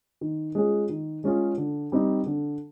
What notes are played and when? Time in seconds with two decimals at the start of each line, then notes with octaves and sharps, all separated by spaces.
0.21 D#3
0.55 G#3 C#4 F4 G#4
0.89 D#3
1.24 G#3 C#4 F4 G#4
1.58 D3
1.92 G3 C4 D#4 G4
2.26 D3